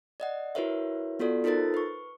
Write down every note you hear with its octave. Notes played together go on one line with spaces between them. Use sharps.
D5 D#5 F#5
E4 F#4 A#4 B4 C#5 E5
B3 F4 F#4 A4 D5
D#4 F4 A4 A#4 C5 A6
B4 C#6